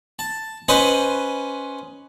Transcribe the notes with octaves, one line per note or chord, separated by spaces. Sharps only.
A5
C#4 B4 C5 D#5 C6